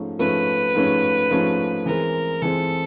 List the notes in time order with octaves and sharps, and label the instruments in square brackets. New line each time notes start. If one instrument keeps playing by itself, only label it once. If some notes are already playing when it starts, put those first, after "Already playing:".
Already playing: [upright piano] G#2 F3 A3 C#4
[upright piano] G#2 F3 A3 C#4 [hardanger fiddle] B4
[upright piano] G#2 F3 A3 C#4
G#2 F3 A3 C#4
[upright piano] E3 G#3 C4 [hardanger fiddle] A#4
[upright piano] E3 G#3 C4 [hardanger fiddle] A4